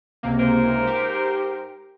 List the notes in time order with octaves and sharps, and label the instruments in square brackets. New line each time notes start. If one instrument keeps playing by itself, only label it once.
[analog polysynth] C#2 C3 A#3
[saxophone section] G#2 A#4 C5
[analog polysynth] G4